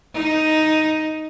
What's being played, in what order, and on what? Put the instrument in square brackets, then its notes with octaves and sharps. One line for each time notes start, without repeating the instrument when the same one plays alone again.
[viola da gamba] D#4